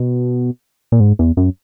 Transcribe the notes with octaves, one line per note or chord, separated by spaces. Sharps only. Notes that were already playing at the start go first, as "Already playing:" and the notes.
Already playing: B2
A#2
G#2
E2
F#2